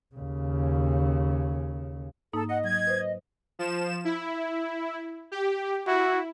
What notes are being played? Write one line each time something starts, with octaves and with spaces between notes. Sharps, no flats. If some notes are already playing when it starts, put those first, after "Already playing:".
D#2 C#3
G#2 A#3 D#4 A4
D#5 F#5
F#3 G#6
B4 C5
F3 E7
E4
G4
E4 F#4